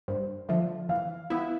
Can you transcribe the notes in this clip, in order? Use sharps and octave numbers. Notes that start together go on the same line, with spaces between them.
G2 C5
D3 F3 E5
E3 F5
B3 E4